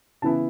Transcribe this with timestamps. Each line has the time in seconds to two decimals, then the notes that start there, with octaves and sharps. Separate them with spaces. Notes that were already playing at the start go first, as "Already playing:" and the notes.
0.22 C#3 E3 B3 E4 A5